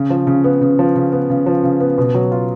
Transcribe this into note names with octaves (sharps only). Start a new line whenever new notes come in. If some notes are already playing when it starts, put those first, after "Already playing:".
Already playing: C#3
F3
C#3
B3
C#3
F3
C#3
B3
C#3
F3
C#3
B3
B2
F#3
F4